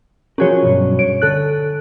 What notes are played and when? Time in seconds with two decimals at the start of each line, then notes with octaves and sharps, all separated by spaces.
0.38 F3 C#4 F#4 G#4 A#4 C#5
0.63 B1 G2
0.99 C#5 D7
1.22 D3 A4 F#6